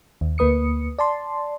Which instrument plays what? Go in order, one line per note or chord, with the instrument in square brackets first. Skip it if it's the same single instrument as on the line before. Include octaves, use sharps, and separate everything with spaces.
[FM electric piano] D#2
D2 A#3 B4 D#6 C#7
D5 A5 C6